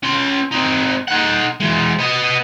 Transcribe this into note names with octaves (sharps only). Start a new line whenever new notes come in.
C#4 C6
C4 D#4
D#4 F#5
E3 G#3
B3 D#5